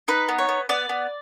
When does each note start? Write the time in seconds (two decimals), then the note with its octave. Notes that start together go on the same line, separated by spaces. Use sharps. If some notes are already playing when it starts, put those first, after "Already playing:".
0.08 D#4 B4
0.29 B3
0.38 C#5
0.49 B3
0.69 B3 D5
0.89 B3